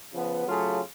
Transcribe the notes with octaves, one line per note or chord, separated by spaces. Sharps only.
C#3 F3 B3
C#3 F#3 A3 F4 G#4